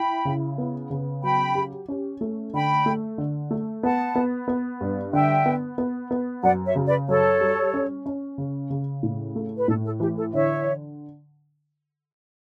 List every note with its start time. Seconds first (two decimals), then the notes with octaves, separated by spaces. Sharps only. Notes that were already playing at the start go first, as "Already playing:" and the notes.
Already playing: E4 G5 B5
0.25 C#3
0.58 B3
0.90 C#3
1.23 F#3 G5 B5
1.55 G4
1.88 C#4
2.21 A3
2.53 D3 G5 B5
2.86 A3
3.18 D3
3.51 A3
3.83 B3 F#5 A5
4.15 B3
4.48 B3
4.81 G2
5.13 D3 E5 G5
5.46 B3
5.78 B3
6.11 B3
6.43 F#2 D5 F#5
6.65 C#5 E5
6.75 C#3
6.86 B4 D5
7.08 F#2 A4 C#5
7.41 G3
7.74 C#4
8.06 C#4
8.38 C#3
8.70 C#3
9.03 A2
9.36 A3
9.56 B4
9.68 A2 A4
9.84 A4
10.00 E3 G4
10.17 A4
10.33 D3 C#5 E5